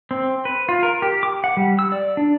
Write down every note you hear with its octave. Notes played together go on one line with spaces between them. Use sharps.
C4
B4
F4
A#4
G4
D6
F#5
G3
E6
D5
D4